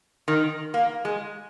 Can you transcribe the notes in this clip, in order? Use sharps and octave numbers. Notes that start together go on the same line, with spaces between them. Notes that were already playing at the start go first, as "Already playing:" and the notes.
D#3
A#3
G#3